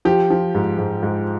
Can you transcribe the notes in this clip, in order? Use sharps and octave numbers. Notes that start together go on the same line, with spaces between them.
F3 G4
F3
G#2
G#2
G#2